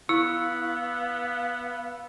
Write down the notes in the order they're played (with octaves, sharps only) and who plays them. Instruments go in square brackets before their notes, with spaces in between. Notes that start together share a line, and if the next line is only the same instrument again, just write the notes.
[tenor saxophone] B3 [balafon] E4 [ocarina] F5 [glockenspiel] E6